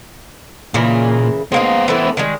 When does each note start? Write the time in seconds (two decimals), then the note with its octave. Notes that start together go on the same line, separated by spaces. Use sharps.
0.74 A#2 C#3 E3 A#4
1.52 G#3 A#3 B3 D#4 C5
1.88 E3 A3 E4
2.17 D#3 G3 G#3